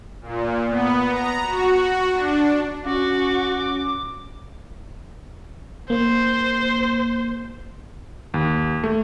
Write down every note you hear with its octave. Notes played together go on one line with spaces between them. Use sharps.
A#2
B3
A#5
F#4
D4
C#4 F#4 D6
A#3 C5
D#2
A3